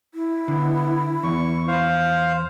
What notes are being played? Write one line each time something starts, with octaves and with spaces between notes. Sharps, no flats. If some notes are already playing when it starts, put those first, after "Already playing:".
E4
D3 B3
E2 C#6
C5 F5